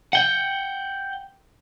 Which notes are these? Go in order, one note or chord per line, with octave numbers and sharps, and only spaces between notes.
F#5 G5